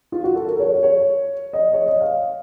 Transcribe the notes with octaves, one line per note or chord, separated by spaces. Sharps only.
F4
F#4
A4
A#4
C#5
C#5
D#5
C#5
D#5
F5